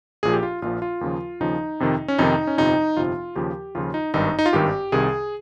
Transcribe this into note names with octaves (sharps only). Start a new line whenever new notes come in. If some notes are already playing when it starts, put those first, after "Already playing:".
A#1 A#2 F3 G#4
G4
F4
A#1 A#2 F3 F4
F4
D#2 C#3 F3
D#2 C#3 F3 D#4
F2 C3 D#3
C#4
F2 C3 D#3 D#4
C#4
G1 F2 C3 F3 D#4
G1 F2 C3 F3 F4
D#2 C#3 F3 G4
D#2 C#3 F3 F4
D#4
G#1 G2 D#3 D#4
D#4
F4
G#1 G2 D#3 G4
C2 C3 D#3 G#4